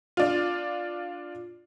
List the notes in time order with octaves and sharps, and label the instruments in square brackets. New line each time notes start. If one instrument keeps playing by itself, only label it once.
[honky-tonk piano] D4 F4